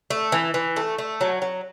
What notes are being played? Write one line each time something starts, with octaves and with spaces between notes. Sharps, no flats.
A3
E3
E3
A3
A3
F#3
F#3